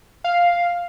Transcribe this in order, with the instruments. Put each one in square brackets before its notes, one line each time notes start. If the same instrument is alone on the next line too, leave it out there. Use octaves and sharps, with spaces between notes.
[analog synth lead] F5